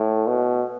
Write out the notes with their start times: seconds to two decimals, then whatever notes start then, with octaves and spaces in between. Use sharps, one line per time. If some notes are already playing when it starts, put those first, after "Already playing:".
Already playing: A2
0.27 B2